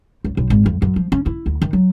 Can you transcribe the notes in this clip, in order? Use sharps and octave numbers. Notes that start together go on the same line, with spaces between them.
C#2
B1
G#1
F2
F#2
F3
C#4
E4
D2
D#3
F#3